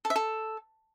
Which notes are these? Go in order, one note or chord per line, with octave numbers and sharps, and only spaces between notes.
A4
E5
A4